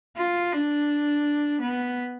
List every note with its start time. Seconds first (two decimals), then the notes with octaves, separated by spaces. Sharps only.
0.17 F4
0.52 D4
1.61 B3